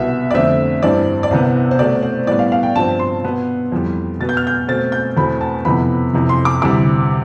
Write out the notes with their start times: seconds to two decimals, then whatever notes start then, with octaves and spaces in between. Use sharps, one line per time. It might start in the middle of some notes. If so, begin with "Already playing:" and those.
Already playing: C2 B2 B3 E5
0.31 D5
0.34 F2 D3 A3 C4 E5
0.83 G2 E3 G3 C4 D5
1.23 D5
1.31 C2 C3 E3 B3 C5
1.71 C5
1.79 B2 A3 C4 D5
2.03 C5
2.27 A2 G3 B3 D5
2.39 F5
2.52 F5
2.63 G5
2.76 G2 F3 C4 A5
2.99 C6
3.23 B2 B3
3.72 F2 E3 G3
4.20 B2 B3 A6
4.29 G6
4.37 F6
4.47 G6
4.68 B2 A3 C4 A6
4.92 G6
5.17 E2 B2 A3 C4 B5
5.41 A5
5.65 F2 C3 E3 B3 B5
6.13 F2 C3 E3
6.29 C6
6.45 D6
6.61 D2 C3 E3 G3 D6